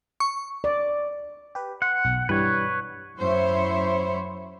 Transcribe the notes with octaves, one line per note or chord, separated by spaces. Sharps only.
C#6
D5
G4 B4
F#5 C6
B1
G2 E3 G3 B4 C#5
F#2 E4 C5 C#5 E5